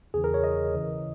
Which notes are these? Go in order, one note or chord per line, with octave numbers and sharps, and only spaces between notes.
E2 C#3 E3 G#4
A#4
C#5
D#5
D#2 C#3 E3